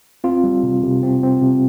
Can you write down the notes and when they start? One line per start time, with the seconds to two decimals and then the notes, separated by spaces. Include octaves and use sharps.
0.24 C4 F4
0.44 G3
0.63 C3
0.83 C3
1.03 C4
1.23 C4
1.42 C3